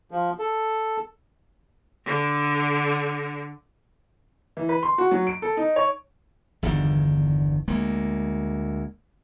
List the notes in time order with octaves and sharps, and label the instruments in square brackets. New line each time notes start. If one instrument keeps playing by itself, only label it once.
[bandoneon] F3
A4
[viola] D3 D4
[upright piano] E3
B4
C6
F#4
F#3
D7
A4
D#4
C#5
[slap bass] G1 E2 D3 D#3
D2 G#3 A#3